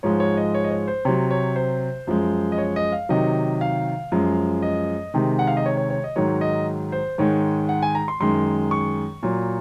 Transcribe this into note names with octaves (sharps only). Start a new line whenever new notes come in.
G#2 F3 G#3 C#5
C#5
D#5
C#5
D#5
C#5
C5
C3 F#3 C#5
C#5
C5
F#2 F3 G#3
D#5
C#5
D#5
F5
C3 D#3 F#3 D#5
F5
F#2 F3 G#3
D#5
C3 D#3 G#3
F#5
F5
D#5
C#5
C#5
C#5
D#5
G#2 D#3 F#3 C#5
D#5
C5
G#2 D#3 G#3 C#5
F#5
G#5
A#5
C6
F#2 D#3 G#3 C6
C#6
A#2 F#3